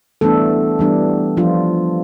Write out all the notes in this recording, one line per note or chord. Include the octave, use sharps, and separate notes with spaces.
E3 G3 A3 B3 D4 A4
E3 G3 B3 D4
F3 D4 F4